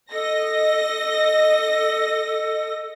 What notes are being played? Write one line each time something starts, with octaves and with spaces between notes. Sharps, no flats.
A4 D#5 A#6